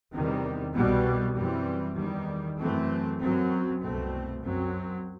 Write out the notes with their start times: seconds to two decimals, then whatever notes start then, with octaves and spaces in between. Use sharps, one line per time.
0.13 E2 C3 D#3 G3
0.75 C2 B2 G3 B3
1.36 F#2 E3 G3 C4
1.97 E2 D#3 G3
2.59 F#2 E3 A3 C4
3.21 F#2 F#3 C4
3.81 C2 B2 A3 C4
4.43 F#2 F#3 C4